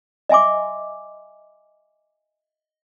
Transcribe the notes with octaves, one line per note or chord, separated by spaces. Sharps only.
D#5 E5 G#5 C6 D6